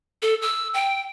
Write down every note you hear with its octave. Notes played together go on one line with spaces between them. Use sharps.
A4
E6
G5